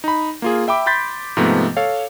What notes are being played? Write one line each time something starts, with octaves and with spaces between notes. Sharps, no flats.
D#4 B5
A#3 F4 G#4
E5 G5 B5 D6
B5 C6 G6 A6 B6
G#2 C3 F3 A3 B3
A4 C#5 F5